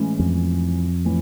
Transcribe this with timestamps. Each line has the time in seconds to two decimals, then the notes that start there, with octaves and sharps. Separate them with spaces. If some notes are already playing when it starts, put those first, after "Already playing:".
Already playing: A2 E3 G#3 C#4 E4
0.19 F2
1.05 A2 E3